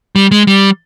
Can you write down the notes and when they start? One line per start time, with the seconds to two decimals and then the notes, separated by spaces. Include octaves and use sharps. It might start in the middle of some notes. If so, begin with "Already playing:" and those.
0.16 G3
0.31 G#3
0.47 G3